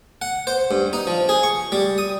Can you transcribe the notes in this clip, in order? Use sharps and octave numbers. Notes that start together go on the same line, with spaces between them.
F#5
C5
G2
D#4
F3
G#4
C#6
G3
D#6